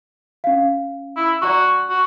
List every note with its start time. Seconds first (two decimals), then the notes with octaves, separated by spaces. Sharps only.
0.44 C#4 F5
1.16 E4
1.42 F#4 D5 A#5 C#6
1.90 F#4